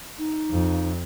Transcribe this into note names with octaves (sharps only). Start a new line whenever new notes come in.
D#4
F2